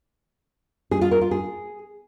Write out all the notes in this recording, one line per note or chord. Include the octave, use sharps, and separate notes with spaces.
G#4
F4
A#4
F4
G#4